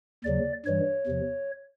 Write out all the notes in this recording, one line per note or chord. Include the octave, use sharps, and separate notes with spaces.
D#2 C#3 F#3 D5
G2 E3 G3 C#5
E2 C3 F3